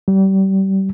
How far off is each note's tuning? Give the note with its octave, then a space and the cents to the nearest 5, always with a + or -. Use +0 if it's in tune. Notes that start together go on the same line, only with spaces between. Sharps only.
G3 -30